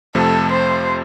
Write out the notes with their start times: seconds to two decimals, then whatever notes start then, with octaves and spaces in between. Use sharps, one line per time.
0.15 F2 C3 F3 A3 A4
0.51 C5